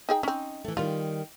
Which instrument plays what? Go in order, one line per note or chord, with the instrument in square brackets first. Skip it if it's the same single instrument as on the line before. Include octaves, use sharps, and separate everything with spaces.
[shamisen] D#4 G#4 G5
[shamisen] C4 C#4 [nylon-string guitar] D#4
[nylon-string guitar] E3 A3
[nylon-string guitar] D#3 G3 [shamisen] F4